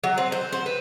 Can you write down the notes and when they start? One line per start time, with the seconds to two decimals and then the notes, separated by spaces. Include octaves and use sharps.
0.04 F#3
0.18 C4
0.32 C5
0.53 C5
0.66 B4